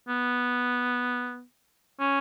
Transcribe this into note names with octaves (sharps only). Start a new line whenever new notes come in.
B3
C#4